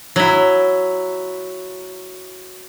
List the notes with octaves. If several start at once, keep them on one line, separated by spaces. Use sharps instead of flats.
F#3 E4